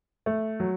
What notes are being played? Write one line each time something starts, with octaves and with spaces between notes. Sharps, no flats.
A3
F#3